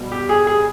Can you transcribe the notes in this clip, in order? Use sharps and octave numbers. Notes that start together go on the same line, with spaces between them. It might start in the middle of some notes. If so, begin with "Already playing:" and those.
Already playing: B2 G3
G4
G#4
G#4